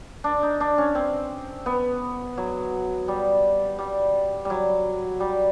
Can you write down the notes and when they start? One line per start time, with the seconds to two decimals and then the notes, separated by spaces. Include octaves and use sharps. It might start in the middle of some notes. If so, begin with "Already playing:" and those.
0.24 D4
0.43 D#4
0.60 D4
0.78 C#4
0.95 C4
1.66 B3
2.38 F#3
3.08 G3
3.79 G3
4.45 F#3 G3
5.20 G3